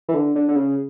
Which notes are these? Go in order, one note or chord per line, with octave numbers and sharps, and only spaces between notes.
E3
D3
D3
D3
C#3